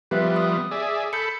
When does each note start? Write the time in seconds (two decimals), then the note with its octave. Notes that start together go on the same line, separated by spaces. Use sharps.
0.11 F3 G3 B3 G4 B4 E5
0.36 D#6
0.71 G#4 D5 E5
1.13 A4 B5 G6 C#7